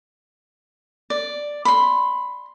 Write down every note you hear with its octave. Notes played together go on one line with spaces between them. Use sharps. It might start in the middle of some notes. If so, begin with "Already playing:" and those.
D5
B5 C6